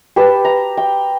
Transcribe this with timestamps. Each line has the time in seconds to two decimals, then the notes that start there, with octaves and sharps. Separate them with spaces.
0.16 G4 B4 A5
0.45 A#5
0.77 G5